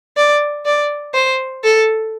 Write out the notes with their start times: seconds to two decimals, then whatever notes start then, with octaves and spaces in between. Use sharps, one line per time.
0.17 D5
0.66 D5
1.15 C5
1.64 A4